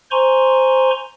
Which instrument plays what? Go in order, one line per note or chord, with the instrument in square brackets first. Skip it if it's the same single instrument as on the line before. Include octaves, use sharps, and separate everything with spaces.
[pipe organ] C5 G#5 A#5 C6 C#6